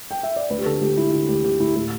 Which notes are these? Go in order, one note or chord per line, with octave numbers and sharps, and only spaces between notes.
G5
E5
D5
D2 B4
G4
D3 A4
D2 G4
A3 E4
D3 E4
D2 G4
D3 G4
D2 E4
A2 G4